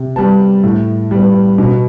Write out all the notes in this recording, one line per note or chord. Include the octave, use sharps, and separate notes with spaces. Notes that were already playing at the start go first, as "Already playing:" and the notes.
Already playing: C3
G3 B3 A5
A2
G3 B3
B2